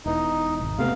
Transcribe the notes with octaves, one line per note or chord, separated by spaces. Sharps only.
E1 E3 D#4
G#1
C3 A3 B3 F5